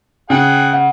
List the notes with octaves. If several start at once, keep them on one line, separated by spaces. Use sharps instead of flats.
C#3 G#4 F#5 G5
F#5